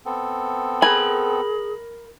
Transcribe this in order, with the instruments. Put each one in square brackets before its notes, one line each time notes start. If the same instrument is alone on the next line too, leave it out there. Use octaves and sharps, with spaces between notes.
[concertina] B3 C4 A4
[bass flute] G#4 [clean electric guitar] A#4 B5 [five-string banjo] G#5